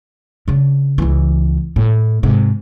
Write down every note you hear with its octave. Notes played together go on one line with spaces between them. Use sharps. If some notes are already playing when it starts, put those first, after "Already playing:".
C#3 D4
C#2 E3
A2
G#2 C3